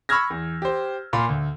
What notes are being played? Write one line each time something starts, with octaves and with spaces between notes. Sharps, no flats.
B5 C#6 E6 F6 G#6 A#6
E2
G4 C5
A#2 F5 B5 C6
D2